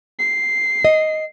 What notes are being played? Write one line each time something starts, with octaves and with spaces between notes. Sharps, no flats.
C7
D#5